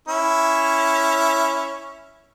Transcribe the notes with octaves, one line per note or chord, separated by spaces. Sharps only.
C#4 E4